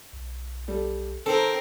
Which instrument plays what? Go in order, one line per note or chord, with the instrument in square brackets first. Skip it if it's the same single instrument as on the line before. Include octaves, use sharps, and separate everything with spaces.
[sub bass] B1
[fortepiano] G3 A4
[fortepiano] D#3 [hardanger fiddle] C4 A#4 [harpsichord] A4